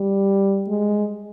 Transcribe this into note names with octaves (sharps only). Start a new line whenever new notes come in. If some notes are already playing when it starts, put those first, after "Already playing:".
Already playing: G3
G#3